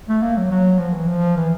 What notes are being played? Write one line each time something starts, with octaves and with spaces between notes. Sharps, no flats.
A3
A#3
F#3
F#3
F3
E3
F3
E3